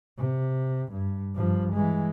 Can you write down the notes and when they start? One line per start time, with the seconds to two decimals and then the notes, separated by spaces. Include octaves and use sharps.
0.18 C3
0.92 G2
1.35 G2 F3
1.73 E3 G#3